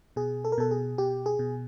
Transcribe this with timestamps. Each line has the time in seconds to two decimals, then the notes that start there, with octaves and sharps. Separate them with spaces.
0.16 B2 G#4
0.45 A4
0.52 A#4
0.58 B2 A4
0.71 G#4
0.98 B2 G4
1.26 G#4
1.39 B2